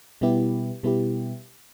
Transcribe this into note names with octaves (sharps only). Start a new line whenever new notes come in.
B2 G3 B3 E4 G4
B2 G3 B3 E4 G4